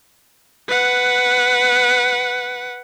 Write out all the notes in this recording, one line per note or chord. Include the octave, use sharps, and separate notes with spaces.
B4 F#5